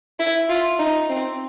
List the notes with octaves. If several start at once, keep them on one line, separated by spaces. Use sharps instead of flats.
E4
F4
D#4
C4